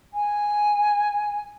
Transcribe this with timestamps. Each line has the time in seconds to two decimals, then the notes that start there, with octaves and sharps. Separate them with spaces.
0.13 G#5